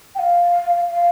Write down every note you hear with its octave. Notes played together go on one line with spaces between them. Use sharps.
G5
F5
F5